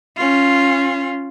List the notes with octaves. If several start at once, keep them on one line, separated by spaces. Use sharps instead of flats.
C#4 F4